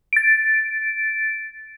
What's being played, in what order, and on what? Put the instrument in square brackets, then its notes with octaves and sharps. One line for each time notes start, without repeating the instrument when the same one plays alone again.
[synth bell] A6 D7